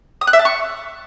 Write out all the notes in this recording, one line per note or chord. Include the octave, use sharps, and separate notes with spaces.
D#6
F#6
E5
A5
C#6